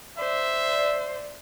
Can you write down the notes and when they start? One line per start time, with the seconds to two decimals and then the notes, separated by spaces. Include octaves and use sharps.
0.18 C5 D5 E5